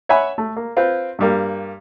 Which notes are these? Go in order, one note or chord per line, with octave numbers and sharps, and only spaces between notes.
C#5 E5 F#5 G#5 B5
A3
A#3
C4 F4 B4
G2 G3 A#3